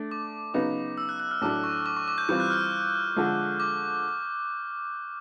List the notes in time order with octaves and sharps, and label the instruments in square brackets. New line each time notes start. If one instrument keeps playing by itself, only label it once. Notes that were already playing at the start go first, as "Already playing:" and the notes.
Already playing: [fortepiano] A3 D4
[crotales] D6
[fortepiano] C#3 F#3 B3 D#4 [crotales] D6
[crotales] E6
F#6
F#6
F6
[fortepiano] A2 F#3 A3 D4 [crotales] D6
[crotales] C#6
D6
C#6
D6
G6
[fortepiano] E3 G3 C4 F4 [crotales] G6
[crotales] F#6
F6
[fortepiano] D3 F3 G#3
[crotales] D6